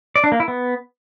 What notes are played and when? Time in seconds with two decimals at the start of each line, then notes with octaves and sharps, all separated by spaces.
0.16 D5
0.24 D4
0.32 A#3
0.40 E4
0.48 B3